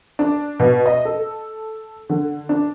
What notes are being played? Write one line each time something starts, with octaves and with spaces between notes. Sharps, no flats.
D4
B2
D#5
A4
D3
D4